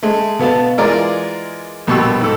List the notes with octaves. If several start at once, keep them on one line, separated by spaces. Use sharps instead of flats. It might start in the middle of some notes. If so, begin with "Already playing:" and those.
G#3 A3
B2 B3 F5 A5
E3 G#3 F4 A#4 D5
A#1 B2 G3 C#6 E6
G#2 A4